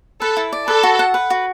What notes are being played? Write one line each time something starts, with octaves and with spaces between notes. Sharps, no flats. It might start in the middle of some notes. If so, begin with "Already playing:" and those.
A4 B4
E4
D5
A4 B4
F#4
F#5
B4
F#4